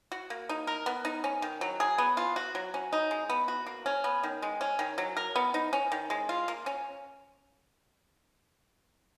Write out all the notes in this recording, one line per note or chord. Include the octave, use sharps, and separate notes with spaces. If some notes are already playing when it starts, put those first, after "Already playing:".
F#4
A#3
D#4
A#4
B3
D#4
C#4
D#3
F#3
G#4
B3
F4
F#4
F#3
C#4
D#4
G#3
B3
F#4
A#3
C#4
B3
D#3
G#3
C#4
D#3
F#3
A#4
B3
D#4
C#4
D#3
G#3
F4
A#3
C#4